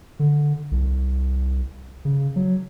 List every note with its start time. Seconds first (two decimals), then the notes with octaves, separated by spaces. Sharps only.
0.19 D3
0.71 C2
2.05 C#3
2.36 F#3